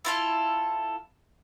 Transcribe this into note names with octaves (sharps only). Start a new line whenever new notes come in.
E4 F4 A4